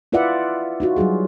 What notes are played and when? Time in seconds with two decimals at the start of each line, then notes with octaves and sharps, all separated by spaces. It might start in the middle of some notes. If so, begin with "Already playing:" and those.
0.12 E4 F4 B4 D5 E5 F#5
0.80 D#4 F4 F#4
0.97 F#3 G3 F#4 G#4